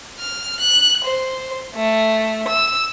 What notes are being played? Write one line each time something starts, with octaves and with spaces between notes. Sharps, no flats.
F6
F#6
C5
A3
E6